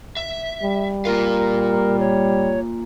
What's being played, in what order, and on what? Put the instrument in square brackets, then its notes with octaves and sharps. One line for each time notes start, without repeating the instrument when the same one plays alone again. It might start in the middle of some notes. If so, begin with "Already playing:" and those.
[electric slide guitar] E5
[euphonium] G3
[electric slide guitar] A#3 F4 F5 [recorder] A#4
[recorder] C#5